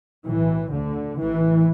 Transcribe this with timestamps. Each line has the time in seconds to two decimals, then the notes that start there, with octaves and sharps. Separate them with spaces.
0.25 B1 A2 E3
0.72 D2 D3
1.19 A1 A2 E3